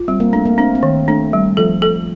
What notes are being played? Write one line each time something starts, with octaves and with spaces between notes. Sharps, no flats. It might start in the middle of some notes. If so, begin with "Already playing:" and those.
Already playing: F4
G3 C4
A#3
A3 D4
A#3
C4 D4
C4
D#3
A3 D4
G3
F3 A4
A4